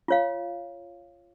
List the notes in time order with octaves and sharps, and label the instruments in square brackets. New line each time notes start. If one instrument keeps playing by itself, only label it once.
[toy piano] F4 C#5 F5